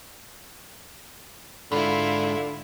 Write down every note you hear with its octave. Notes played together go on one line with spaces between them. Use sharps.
G#2 D3 E4 F4 B5 C6